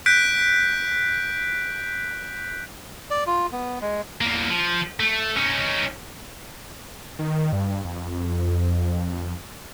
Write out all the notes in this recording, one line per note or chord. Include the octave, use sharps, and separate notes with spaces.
F#6 G6 B6 D7
D5
F4
B3
G#3
E2 A#3
F3
A3
C#4 D#4
D#3
G2
F2